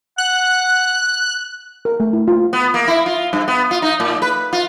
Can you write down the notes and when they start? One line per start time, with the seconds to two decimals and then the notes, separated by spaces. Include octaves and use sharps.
0.18 F#5 F#6
1.85 A#4
2.00 A3
2.13 E4
2.28 F4
2.53 B3
2.74 A#3
2.87 E4
3.06 F4
3.33 G2
3.48 B3
3.71 F4
3.82 D#4
4.00 A2
4.22 B4
4.53 F4